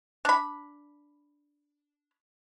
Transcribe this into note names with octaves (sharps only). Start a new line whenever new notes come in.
D4 B5